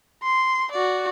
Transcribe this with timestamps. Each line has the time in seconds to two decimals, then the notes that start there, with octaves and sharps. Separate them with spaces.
0.23 C6
0.72 F#4 D5